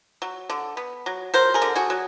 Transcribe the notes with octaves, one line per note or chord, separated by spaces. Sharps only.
F#3
D3
B3
F#3
F#3 A#4 C5
G#4 A#4
D3
F#4 G#4
F#3